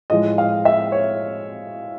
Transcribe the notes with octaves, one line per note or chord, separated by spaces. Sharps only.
A2 F3 G#3 D#5
F5
E5
C#5